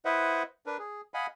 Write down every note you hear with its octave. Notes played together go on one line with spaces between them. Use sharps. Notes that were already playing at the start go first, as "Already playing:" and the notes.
E4 B4 C5 D#5 E5 F#5
D4 A#4 B4
G#4
D#5 F5 F#5 G#5 B5